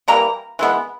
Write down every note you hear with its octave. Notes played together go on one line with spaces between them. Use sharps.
E3 G3 A#3 A#5
E3 G#3 B3